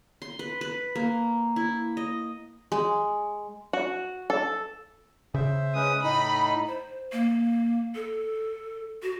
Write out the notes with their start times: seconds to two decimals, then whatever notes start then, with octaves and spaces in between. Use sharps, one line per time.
0.22 C6
0.39 B4
0.61 B4
0.95 A#3
1.56 E4
1.97 D#5
2.72 G#3
3.73 F#4
4.30 A4
5.34 C#3 C5 E5
5.75 G#3 C#4 B4 D#6
6.03 A2 D#4 D#5 B5
6.68 C5
7.12 A#3
7.95 A4
9.03 F#4